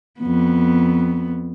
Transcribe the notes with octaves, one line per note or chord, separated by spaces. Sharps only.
F2 B3